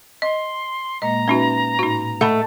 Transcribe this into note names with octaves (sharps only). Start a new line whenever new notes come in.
D#5 C6
A#2 G#3 A#3 D#5 A#5
C#4 D#4 F#4 B4 E5
A2 D#4 F#4
A3 D#5 E5 F#5 B5 C#6